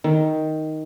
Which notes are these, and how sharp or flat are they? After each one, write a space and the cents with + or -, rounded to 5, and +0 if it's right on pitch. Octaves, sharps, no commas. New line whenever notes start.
D#3 +5